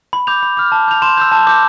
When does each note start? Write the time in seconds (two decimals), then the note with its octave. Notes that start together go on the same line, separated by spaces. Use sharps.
0.13 B5
0.27 D6 G6 F7
0.43 B5
0.57 D6 F6
0.72 A5
0.88 D6 G6 F7
1.02 C6 E7
1.17 E6 G6
1.32 A5
1.47 D6 G6